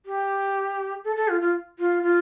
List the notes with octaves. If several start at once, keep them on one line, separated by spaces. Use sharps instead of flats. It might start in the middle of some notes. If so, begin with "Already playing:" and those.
G4
A4
A4
F4
F4
F4
F4